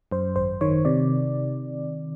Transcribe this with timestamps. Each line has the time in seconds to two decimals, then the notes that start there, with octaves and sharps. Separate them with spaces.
0.12 F#2 C5
0.36 G#1 C5
0.61 D#3 C#5
0.85 C3 D5